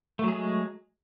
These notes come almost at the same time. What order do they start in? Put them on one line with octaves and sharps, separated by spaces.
A3 F#3 G#4 G#3